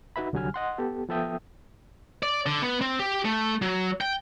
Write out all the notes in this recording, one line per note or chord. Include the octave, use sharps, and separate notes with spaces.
D#4 F#4 B4 E5 B5
C2 D3 F#3 G3 G#5 F6
D#5 F#5 C6
B3 G4 A4
F3 B3 A4 E5 G5 D#6
D5
D3
B3
C4
G4
A3
F#3
G5